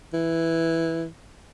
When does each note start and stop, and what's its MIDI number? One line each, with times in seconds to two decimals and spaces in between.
0.13 1.07 52